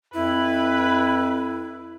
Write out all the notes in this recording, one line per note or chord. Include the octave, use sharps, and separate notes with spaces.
F2 E4 B4